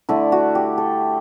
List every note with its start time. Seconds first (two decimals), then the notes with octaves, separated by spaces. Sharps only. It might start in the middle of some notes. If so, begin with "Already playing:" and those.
0.09 D3 A3 E4
0.32 F#4
0.55 G4
0.78 A4